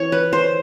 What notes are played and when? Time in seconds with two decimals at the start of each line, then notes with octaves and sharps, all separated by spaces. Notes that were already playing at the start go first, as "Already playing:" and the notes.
Already playing: E3 C4 C#5
0.12 B4
0.33 C5